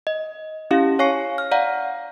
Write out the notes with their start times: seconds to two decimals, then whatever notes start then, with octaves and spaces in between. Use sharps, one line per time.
0.07 D#5
0.71 C#4 E4 G4 F5
0.99 C#5 F5 G#5 C#6 C7
1.38 F6
1.51 D5 F5 F#5 A#5